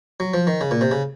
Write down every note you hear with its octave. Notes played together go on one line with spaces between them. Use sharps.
F#3
F3
D#3
C#3
A#2
C3
C#3